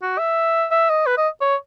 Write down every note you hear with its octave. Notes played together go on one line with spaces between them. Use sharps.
F#4
E5
E5
D#5
B4
D#5
C#5